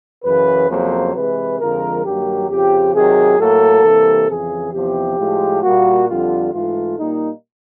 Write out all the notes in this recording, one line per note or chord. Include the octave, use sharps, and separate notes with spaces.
F#2 C#3 E3 B4
F2 C#3 F#3 A#3 C5
C3 E3 G#3 B4
F2 D3 F3 G#3 A#4
G2 D#3 F#3 A#3 G4
F2 C#3 F3 G4
C3 D#3 F#3 G#4
A2 F#3 A#3 A4
C3 E3 G3 A#3
F2 C#3 E3 G#4
E2 C3 F3 G4
A2 F3 G#3
A#2 G3 A#3 F#4
F2 D3 G3 F4
G#2 E3 A3 F4
A#2 G3 A#3 D#4